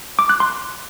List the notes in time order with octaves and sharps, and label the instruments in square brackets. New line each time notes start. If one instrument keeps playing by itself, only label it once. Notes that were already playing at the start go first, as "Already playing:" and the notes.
[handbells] D6
F#6
C6